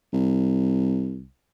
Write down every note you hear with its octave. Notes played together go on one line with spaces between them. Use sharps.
C2